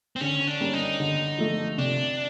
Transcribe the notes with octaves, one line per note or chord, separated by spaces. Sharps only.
C4
D3 C#4
D4
G3 A#3 C#4
D#4
D3
F3 A3
C3 D4